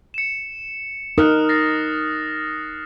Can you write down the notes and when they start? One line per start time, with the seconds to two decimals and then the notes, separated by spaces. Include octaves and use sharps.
0.14 C#7 E7
1.18 D#4 A#4 D#6 F6 F#6
1.49 A6 A#6 C7